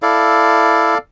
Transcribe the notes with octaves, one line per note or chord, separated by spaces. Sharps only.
E4 A4 D5 F5